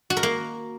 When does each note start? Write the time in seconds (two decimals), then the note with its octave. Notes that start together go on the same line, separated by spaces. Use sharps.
0.10 F#4
0.17 A#4
0.23 A#3